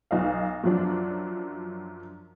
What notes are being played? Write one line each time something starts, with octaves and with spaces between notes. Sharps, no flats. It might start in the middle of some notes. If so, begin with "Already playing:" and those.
B1 D#5 F5
F#2 F3 F#3 D4